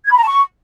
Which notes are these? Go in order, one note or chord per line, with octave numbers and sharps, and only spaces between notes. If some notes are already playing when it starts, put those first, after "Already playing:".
G#6
B5
A#5
A5
C#6